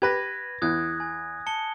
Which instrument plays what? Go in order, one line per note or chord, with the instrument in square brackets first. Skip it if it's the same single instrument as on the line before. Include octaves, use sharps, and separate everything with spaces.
[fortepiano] G4 B4 [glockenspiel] G#6 A#6
[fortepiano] E2 E3 [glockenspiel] D#6 F#6 G#6
[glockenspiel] G#5
A5 C#7 G7